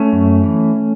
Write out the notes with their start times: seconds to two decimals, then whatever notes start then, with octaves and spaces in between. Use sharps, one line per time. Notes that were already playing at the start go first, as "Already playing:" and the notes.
Already playing: A3 C#4
0.13 F#2
0.43 E3